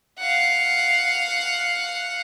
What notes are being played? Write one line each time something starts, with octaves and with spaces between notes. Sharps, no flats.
F5 F#5